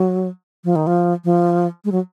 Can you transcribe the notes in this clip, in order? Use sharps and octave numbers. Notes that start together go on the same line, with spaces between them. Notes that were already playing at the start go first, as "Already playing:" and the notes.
Already playing: F#3
F3
D#3
F3
F3
G#3
F#3